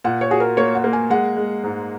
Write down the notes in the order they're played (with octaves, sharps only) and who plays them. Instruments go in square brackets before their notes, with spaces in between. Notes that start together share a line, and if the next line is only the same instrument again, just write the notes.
[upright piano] A#2 [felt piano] F#5
[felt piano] C#5
[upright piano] F#4 [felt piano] G#4
[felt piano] A#4
[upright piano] A#3 [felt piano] C#5
[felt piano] F#5
[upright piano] A#3
[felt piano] G#5
[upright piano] G#3 [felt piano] F#5
[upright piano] G#3
G#2